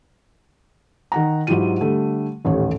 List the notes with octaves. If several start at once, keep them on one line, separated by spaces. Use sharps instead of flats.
D#3 F#5 A#5
G#2 F#3 E4 F4 G4 D#7
D3 G3 A3
D#1 A1 D#2 A3 C#5